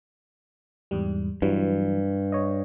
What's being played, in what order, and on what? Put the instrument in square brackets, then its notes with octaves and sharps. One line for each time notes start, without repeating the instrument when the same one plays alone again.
[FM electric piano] E2 G#2 G3
[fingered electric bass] G2 [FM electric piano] E3 F#3
[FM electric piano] C#5 D#5